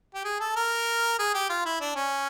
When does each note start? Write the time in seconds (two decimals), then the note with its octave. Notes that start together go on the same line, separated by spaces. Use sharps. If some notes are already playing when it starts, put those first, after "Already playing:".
0.15 G4
0.24 G#4
0.40 A4
0.56 A#4
1.19 G#4
1.34 G4
1.50 F4
1.65 E4
1.81 D4
1.96 C#4